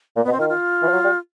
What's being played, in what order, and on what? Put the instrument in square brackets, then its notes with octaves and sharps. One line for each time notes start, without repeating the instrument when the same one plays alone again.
[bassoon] A#2 [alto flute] A#3
[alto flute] B3
[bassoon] B2
[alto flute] C4
[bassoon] D#3 [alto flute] F4
[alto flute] F4
[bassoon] E3
F3
F#3
G3